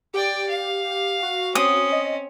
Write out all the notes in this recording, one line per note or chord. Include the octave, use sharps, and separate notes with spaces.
G4 D5 G5
F5
F#4
C4 C#4 D#6
D#5